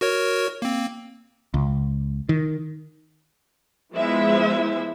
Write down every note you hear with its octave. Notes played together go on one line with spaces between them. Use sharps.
F#4 A#4 C#5
A#3 C4
C#2
D#3
F3 G#3 B3 E4 C5 E5